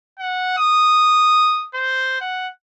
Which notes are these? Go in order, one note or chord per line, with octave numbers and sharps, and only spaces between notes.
F#5
D#6
C5
F#5